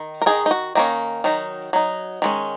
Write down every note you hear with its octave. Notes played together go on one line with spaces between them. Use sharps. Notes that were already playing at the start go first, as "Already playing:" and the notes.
Already playing: D#3
A#4
D#3 G#3 D#4 G#4
D#4
F#4
D#3 A#3 C#4 D#4
D#3 F#3 D#4
F#3 D#4
D#3 G#3 C#4